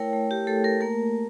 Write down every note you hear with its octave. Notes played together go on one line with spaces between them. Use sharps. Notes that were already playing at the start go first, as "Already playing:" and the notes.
Already playing: A3 E4 A#4 C#5 G5
A3
G4
A3 A4
A#4
A#3 A#4